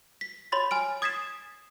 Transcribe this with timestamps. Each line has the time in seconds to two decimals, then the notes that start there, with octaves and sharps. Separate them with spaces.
0.21 B6
0.52 C#5 B5 C6 A6
0.71 G#5 F6 D7
1.02 D#6 G#6 A6 B6 C7 E7